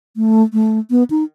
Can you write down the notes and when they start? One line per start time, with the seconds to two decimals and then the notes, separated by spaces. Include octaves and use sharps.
0.16 A3
0.53 A3
0.91 B3
1.10 D#4